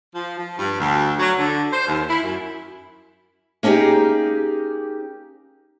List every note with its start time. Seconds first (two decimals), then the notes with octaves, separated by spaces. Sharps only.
0.14 F3
0.38 F3
0.57 G2
0.79 D2
1.19 F#3
1.37 D3
1.72 C5
1.87 D#2
2.08 E4
2.23 F#2
3.63 A#3 C#4 D#4 G4 G#4